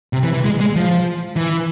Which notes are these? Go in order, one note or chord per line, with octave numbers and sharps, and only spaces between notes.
C3
E3
E3
G#3
G#3
F3
E3